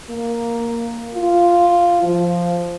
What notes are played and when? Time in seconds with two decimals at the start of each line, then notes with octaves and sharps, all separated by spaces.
0.10 A#3
1.14 F4
2.03 F3